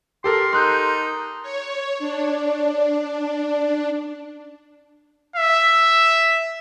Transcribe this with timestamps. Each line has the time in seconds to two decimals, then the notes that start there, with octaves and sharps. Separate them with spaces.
0.24 G4 A4 A#4 C6
0.53 D#4 C6 F#6 G6
1.42 C#5
1.99 D4
5.36 E5